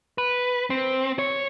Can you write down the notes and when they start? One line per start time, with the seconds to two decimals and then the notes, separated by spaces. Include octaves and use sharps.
0.18 B4
0.70 C4
1.19 C#5